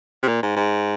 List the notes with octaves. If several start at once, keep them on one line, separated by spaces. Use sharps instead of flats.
C3
A#2
G#2
G#2